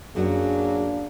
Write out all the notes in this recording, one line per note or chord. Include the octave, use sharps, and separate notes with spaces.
F#2 F#3 A#3 D4 F#4 G#4